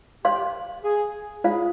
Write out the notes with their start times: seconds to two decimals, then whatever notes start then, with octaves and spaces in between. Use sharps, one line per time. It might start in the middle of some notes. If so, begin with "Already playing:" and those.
0.25 G4 C5 F5 C6
0.84 G#4
1.44 F4 G#4 C5 F5